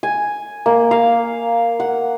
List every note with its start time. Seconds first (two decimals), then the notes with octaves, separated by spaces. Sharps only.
0.03 G#5
0.66 A#3
0.91 F5
1.80 F#5